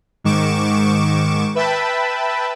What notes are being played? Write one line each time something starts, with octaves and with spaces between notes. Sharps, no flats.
G#2 D#3 C#6 D6 E7
B4 E5 G5 A5 B5